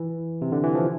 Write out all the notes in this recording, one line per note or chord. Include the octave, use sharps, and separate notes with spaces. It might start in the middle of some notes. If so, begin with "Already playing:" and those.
Already playing: E3
C3
D3
E3
F3